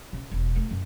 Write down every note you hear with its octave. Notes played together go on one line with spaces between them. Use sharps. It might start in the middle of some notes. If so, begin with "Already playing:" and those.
C#3
E1
A3
F#2